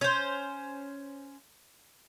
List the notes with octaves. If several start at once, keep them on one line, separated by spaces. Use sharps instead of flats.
C#4 C5